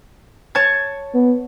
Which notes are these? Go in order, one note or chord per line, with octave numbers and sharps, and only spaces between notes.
C#5 A5 G#6
B3